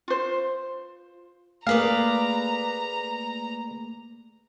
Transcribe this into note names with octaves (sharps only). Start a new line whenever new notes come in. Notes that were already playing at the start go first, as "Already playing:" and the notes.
F4 C5
A3 A#3 G#4 B4 D5 F5 A#5